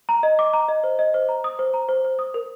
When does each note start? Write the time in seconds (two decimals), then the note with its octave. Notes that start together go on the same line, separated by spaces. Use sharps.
0.09 A#5
0.23 D#5
0.39 D6
0.53 A#5
0.69 D#5
0.84 C5
0.99 D#5
1.14 C5
1.29 A#5
1.44 D#6
1.59 C5
1.74 A#5
1.89 C5
2.04 C5
2.19 D#6
2.34 A#4